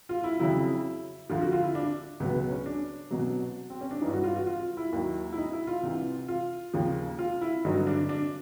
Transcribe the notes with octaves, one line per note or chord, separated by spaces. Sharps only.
F4
E4
F2 C#3 F#3 E4
D2 D3 F3 F4
F#4
F4
E4
D4
C#2 B2 F#3 B3
B3
C#4
D4
C2 B2 F#3
C4
C#4
D4
G2 E3 D#4
F#4
F4
F#4
F4
F4
E4
D#2 D#3 F#3
E4
D#4
E4
F4
C2 C3 E3
F4
D#2 C#3 F3
F4
E4
G2 D3 F#3 D#4
D4
D4